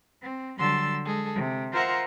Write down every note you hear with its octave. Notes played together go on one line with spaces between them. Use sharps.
C4
D3 F#3 G3 C6 E6 A6
G#3 G#4 A4
C3
F4 A#4 C5 E5 F#5 A#5